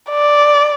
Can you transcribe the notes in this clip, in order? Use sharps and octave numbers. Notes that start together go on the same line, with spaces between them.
D5